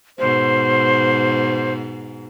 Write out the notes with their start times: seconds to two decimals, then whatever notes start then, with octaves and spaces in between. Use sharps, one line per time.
0.19 G#2 B2 C5